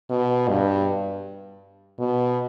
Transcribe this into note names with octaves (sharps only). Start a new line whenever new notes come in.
B2
G2
B2